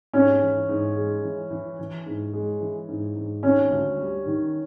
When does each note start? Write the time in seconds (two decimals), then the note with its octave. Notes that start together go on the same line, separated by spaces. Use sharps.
0.13 G#2 C#4
0.42 E3
0.69 G#2
0.96 G#3
1.23 E3
1.50 E3
1.79 E3
2.06 G#2
2.33 G#3
2.60 E3
2.88 G#2
3.16 G#2
3.43 D#3 C#4
3.70 D2
3.98 G3
4.26 D#3